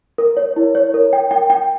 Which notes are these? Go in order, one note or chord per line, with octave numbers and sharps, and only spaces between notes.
A#4
C#5
E4
C#5
A#4
G5
G5
G5